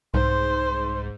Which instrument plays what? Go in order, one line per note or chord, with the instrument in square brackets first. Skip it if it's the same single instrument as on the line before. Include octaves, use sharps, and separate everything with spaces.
[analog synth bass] C2 [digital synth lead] G#2 [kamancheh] C5 [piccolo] C6